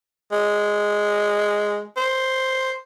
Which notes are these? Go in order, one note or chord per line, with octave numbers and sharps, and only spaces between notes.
G#3
C5